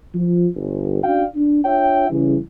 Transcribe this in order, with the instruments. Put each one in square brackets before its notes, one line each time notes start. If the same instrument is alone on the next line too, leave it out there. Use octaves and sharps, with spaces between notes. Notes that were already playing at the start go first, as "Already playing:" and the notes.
[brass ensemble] F3
G1
C#4 D4 F#4 D5 F5 G5
D4
D4 F4 C#5 E5 G5
C#3 E3 G3